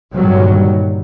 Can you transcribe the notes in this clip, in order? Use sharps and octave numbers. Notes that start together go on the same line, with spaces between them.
G1 A#2 D#3 F#3 G3